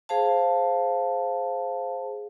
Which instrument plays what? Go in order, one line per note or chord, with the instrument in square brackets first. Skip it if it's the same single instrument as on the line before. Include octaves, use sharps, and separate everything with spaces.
[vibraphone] G#4 C5 F5 A5